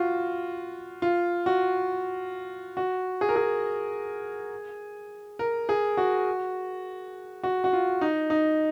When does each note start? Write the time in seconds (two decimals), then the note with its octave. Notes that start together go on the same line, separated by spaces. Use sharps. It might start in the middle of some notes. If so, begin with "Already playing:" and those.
Already playing: F4 F#4
1.02 F4
1.46 F#4
2.77 F#4
3.21 G#4
3.29 A#4
3.36 G#4
5.39 A#4
5.69 G#4
5.97 F#4
7.44 F#4
7.64 F#4
7.73 F4
8.01 D#4
8.30 D#4